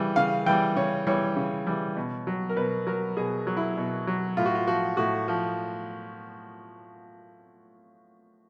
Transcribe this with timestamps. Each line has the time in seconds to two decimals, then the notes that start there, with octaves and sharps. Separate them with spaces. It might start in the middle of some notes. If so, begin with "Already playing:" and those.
Already playing: C#3 E3 G3
0.16 C#3 F5
0.46 E3 G3 G5
0.76 C#3 C#5
1.07 E3 G3 C#5
1.36 C#3
1.67 E3 G3
1.96 B2
2.27 F#3
2.49 A#4
2.56 B2 B4
2.87 F#3 A#4
3.17 B2 G#4
3.47 F#3
3.57 E4
3.77 B2
4.07 F#3
4.37 A2 F4
4.45 F#4
4.55 F4
4.67 F3 F#4
4.97 A2 F#4
5.28 F3